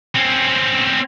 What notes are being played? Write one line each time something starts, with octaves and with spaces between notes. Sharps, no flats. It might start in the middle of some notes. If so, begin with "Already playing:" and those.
C4 C#4